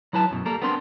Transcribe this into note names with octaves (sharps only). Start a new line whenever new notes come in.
F#3 E4 B4 A5
F#2 B2
G3 A#3 A4 A#4
B3 C4 D4 A#4 C6